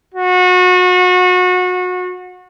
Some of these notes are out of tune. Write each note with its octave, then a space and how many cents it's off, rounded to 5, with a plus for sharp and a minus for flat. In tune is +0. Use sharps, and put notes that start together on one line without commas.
F#4 -30